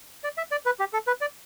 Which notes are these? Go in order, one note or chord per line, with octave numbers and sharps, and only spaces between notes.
D5
E5
D5
B4
G4
A4
B4
D5